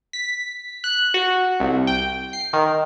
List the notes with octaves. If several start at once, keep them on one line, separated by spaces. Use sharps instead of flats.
B6
F#6
F#4
C2
G5
C7
D#3